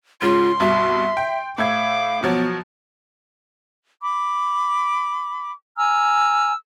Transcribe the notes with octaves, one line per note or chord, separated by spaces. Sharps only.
G#2 C#3 F4 C6
C2 G2 B2 E5
G5
A2 E5 F5 D6 G#6
B2 F3 F#3 B3
B5 D6
G#5 A#5 E6 F6